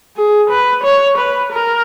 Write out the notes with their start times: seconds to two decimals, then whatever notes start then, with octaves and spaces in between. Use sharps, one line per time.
0.17 G#4
0.50 B4
0.83 C#5
1.18 B4
1.52 A#4